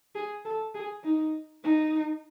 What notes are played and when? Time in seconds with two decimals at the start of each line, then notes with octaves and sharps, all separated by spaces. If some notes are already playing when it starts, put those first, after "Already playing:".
0.15 G#4
0.45 A4
0.74 G#4
1.04 D#4
1.63 D#4